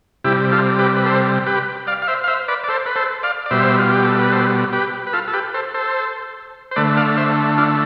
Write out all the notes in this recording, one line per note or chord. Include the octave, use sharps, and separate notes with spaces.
C3 G3 E4 G4
F4 A4
G4 B4
B4
A4 C5
G4 B4
D5 F5
F5
C5 E5
F5
C5 E5
B4 D5
D5
A4 C5
B4
A4 C5
D5 F5
D5
B2 G3 C5 E5
F4
G4
A4
B4
A4 C5
G4 B4
B4
F4 A4
A4
G4 B4
A4 C5
A4 C5
C5
D3 A3 B4 D5
D5 F5
C5 E5
D4 F4